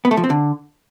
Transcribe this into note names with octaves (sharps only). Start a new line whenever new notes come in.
B3
A3
F3
C4
D3